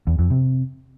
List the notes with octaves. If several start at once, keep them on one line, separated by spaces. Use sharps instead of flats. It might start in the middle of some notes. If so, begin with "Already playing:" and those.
E2
F2
C3